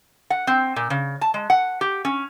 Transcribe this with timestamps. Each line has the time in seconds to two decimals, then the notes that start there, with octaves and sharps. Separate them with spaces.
0.30 F#5
0.47 C4
0.76 A#2
0.90 C#3
1.21 A5
1.34 G#3
1.50 F#5
1.81 G4
2.05 C#4